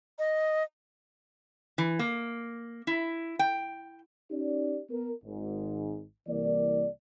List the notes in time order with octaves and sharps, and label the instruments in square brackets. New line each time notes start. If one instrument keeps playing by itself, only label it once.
[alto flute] D#5
[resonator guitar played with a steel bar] E3
A#3
E4
G5
[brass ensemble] C#4 D#4 G4 D5
B3 A#4
G#1 G#2
C2 E3 A#3 D5